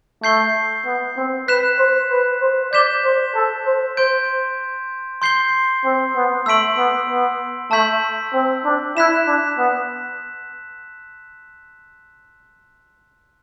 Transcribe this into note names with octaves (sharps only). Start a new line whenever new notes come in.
A3 G6 C7 G7
B3
C4
B4 F#6 B6 E7
C5
B4
C5
D5 G6 B6 E7 G7
C5
A4
C5
C5 C6 G6 D7
C6 G6 C7 G7
C4
B3
A3 E6 B6 D7 F#7
B3
B3
A3 A5 E6 G6 B6 F#7
C4
D4
E4 F#6 B6 E7
D4
B3